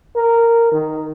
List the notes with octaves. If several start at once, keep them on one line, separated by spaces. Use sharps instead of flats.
A#4
D#3